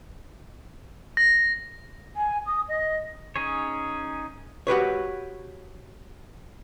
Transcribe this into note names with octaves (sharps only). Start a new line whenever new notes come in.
A#6
G#5
D#6
D#5
C#4 D#4 G#4 C#5
F#4 G4 B4 C#5